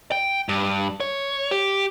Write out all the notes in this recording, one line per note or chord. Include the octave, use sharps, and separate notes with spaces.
G5
G2
C#5
G4